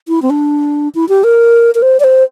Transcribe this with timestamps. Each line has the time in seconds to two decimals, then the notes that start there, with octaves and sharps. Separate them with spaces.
0.08 E4
0.22 C4
0.30 D4
0.95 E4
1.09 G4
1.24 A#4
1.75 A#4
1.82 C5
2.00 D5
2.04 C5